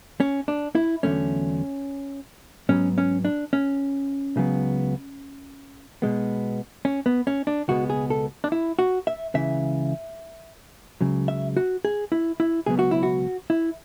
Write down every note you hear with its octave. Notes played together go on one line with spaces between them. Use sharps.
C#4
D4
E4
E2 D3 F#3 A3 C#4
G#2 F#3 B3 C#4
C#4
D4
C#4
C#2 C#3 F#3 B3
B2 G#3 B3
C#4
B3
C#4
D4
C#2 B2 G#3 B3 F#4
G#4
A4
D4
E4
F#4
E5
C#2 C#3 E3 E5
C#2 C#3 F#3
E5
F#4
G#4
E4
E4
C#2 B2 F#3 B3 G#4
F#4
E4
F#4
E4